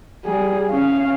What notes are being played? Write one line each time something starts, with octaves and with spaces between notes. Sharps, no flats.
G3 G#4
C#4 F5